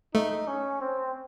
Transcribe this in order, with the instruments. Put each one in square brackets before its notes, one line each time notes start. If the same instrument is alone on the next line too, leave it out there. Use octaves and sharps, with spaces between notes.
[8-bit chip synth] A3 [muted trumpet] D#4
[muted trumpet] C#4
C4